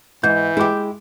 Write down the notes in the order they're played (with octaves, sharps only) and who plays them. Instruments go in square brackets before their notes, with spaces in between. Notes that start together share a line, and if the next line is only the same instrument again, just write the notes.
[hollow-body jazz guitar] G#2 [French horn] E3 [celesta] G6
[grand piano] G#3 D6 [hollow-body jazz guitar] E4 G4